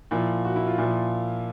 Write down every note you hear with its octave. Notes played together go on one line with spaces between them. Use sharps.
A#2 F3 E4
F#4
E4
F4
A#2 F3 E4